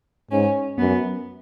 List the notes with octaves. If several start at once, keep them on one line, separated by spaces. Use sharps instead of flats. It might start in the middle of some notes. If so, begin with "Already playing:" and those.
G#2 C#4
F#2 B3